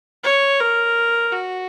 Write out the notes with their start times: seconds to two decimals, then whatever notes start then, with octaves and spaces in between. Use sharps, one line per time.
0.24 C#5
0.60 A#4
1.32 F#4